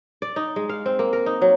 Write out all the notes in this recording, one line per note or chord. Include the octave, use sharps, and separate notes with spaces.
D5
D#4
G#3
F5
C4
A#3
A#4
D#4
F#3